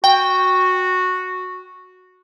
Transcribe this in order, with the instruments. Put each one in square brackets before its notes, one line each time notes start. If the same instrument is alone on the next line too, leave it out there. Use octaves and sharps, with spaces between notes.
[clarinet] F#4 [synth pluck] G5